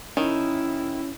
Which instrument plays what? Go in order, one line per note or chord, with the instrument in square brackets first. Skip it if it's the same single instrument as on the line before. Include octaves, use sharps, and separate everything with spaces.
[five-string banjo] D#3 [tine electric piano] C#4 [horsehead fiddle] E4